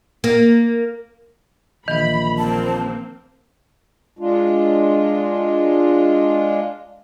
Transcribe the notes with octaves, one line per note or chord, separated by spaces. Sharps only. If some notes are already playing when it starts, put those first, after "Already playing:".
A#3
A#1 D#3 E3 B5
A#3 C4 A5
G#3 D4 F4